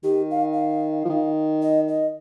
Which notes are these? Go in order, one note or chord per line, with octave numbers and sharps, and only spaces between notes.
D#3 G4
F5
F5
F3
D#3
D#5
D#5